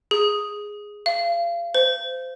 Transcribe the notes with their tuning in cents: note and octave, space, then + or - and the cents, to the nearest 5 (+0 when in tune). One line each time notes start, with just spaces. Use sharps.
G#4 +0
F5 -30
C5 -20